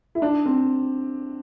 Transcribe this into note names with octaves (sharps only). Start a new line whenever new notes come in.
E4
D4
C4